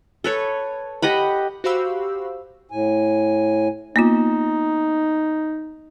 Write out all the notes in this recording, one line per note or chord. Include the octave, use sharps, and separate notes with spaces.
A4 B4 C#5
G4 D#5 F#5 B5
F#4 G4 C5 F5 B5 E6
A2 G#5
A#3 B3 D#4 F4